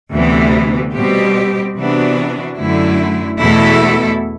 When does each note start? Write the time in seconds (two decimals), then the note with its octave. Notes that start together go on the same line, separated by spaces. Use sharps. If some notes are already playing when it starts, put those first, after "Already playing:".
0.12 D2 C3 E3 B3
0.94 B2 G3 C4 G4
1.75 C3 E3 B3 D4 F#4
2.57 F#2 D3 A3 E4
3.39 E2 B2 A3 E4 A4